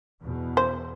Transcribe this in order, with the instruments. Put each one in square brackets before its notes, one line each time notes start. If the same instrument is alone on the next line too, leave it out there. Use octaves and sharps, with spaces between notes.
[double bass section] E2 B2
[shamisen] C5